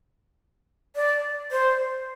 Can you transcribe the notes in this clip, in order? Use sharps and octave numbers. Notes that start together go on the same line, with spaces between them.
D5
C5